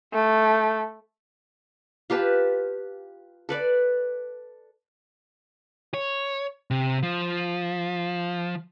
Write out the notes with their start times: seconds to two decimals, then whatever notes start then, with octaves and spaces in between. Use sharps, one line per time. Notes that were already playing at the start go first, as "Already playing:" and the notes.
0.13 A3
2.10 F4 G4 B4 A5
3.49 A4 B4 D5
5.94 C#5
6.71 C3
7.03 F3